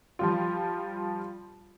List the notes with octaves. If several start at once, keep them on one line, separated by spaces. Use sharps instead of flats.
F3 G3 F4